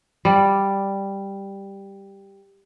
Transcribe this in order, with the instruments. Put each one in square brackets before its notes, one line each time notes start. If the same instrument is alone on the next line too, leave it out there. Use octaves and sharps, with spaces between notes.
[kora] G3 D5